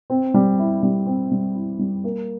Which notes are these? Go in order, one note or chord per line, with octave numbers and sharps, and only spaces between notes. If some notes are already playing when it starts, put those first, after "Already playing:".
C4
G3
E4
G3
C4
G3
E4
G3
A#3